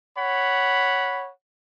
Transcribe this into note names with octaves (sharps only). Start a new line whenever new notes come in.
C#5 F#5 B5